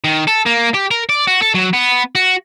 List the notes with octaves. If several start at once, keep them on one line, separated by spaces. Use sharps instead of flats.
D#3
A4
A#3
G4
A#4
D5
F#4
A4
F#3
B3
F#4